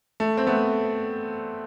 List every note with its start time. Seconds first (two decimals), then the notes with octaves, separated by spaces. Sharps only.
0.20 A3
0.37 C4
0.47 A3 B3